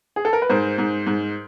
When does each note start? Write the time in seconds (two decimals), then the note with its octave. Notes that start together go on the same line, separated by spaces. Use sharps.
0.16 G#4
0.25 A4
0.33 A#4
0.42 B4
0.49 G#2 A#4 C5
0.78 G#2
1.06 G#2